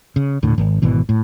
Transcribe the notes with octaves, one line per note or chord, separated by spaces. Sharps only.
C#3
D#1 A2 D3
G#1
G#1 B2 E3
A2